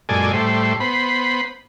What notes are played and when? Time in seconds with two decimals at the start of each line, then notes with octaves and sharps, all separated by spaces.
0.09 F#2 A#2 G#3 A4 D5 G#5
0.33 A2 G3 A3 C5
0.80 B3 C5 B5